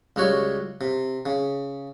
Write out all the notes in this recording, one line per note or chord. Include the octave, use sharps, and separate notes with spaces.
C#2 G3 F#4 C#5
C3
C#3